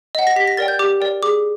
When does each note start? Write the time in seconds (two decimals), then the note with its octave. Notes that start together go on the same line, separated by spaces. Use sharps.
0.15 D#5 F#5
0.27 A#6
0.36 G4 B6
0.48 A#6
0.57 A#4 D5 G5 A6
0.68 G6
0.79 G4 D6
1.00 A#4 D5 G5
1.22 G#4 D6